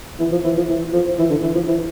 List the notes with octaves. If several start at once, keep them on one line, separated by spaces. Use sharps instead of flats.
E3
F3
E3
F3
E3
F3
E3
D3
E3
F3
E3